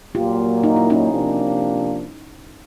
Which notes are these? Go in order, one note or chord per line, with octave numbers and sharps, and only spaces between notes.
A#2 F#3 A#3 F4 G4
D#4
E4
C#4 D#4
C3 F3 A#3 D4